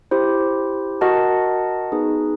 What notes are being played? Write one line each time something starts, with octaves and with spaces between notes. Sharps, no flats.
E4 G4 C5
F#4 A#4 D#5 F#5 A5
B3 D#4 G#4 B4